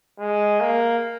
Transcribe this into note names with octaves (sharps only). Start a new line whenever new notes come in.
G#3
A#3